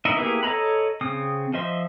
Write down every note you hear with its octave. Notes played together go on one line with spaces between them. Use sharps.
D#4 E4 D#5 E5
A#3 B3 E4 G4 G#4
A4 C#5 D#5 A#5 B5
C#3 C4 D#6
F3 C5 D#5 E5 C6